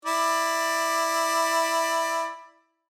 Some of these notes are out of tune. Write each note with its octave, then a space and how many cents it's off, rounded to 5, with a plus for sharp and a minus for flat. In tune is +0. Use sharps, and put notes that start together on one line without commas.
E4 +0 D5 +15